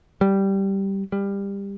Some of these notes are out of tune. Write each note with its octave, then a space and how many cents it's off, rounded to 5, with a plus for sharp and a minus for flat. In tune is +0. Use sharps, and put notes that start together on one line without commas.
G3 -5
G3 +20